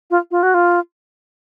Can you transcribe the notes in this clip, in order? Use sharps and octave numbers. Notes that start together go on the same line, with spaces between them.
F4
F4
F#4
F4